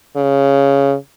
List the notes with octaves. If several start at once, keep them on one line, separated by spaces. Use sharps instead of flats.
C#3